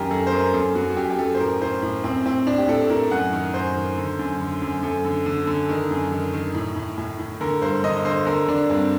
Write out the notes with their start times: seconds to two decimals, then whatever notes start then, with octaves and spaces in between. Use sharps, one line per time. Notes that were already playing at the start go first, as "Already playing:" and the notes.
Already playing: F#2 D#3 G4 A#4
0.11 F#2 A4
0.27 C5
0.32 F#2 A#4
0.53 F#2 A4
0.75 F#2 F#4
0.90 F#4
0.97 F#2 G4
1.10 G4
1.18 F#2 A4
1.35 C5
1.39 A2 A#4
1.62 A2 C5
1.82 A2
2.04 A2 C4
2.25 A2 C4
2.47 A2 D4
2.58 G4
2.68 A2 A4
2.90 A2 A#4
3.11 F#2 F#5
3.33 D#3
3.54 F#2 C5
3.76 D#3
3.97 D3
4.19 F#2
4.40 D3
4.62 F#2
4.83 F#2 A4
5.05 D3
5.26 D3
5.47 D3
5.69 D#3
5.91 F#2
6.12 D#3
6.33 D#3
6.55 A2
6.76 A2
6.98 A2
7.19 A2
7.41 D3 A#4
7.62 G2 C5
7.84 D3 D#5
8.05 D3 C5
8.26 D3 A#4
8.48 D3 D4
8.69 G2 C4